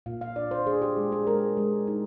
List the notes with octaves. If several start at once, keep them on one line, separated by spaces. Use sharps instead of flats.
A#2 F5
F5
D4 D5
C5
D4 G#4
G4
G#3
G#4
G#3 A#4
G#3
D#4